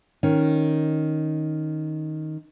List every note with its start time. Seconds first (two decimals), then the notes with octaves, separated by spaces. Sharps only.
0.23 D#3 C#4